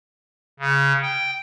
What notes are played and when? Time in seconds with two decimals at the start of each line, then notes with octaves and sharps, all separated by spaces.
0.60 C#3
1.03 G5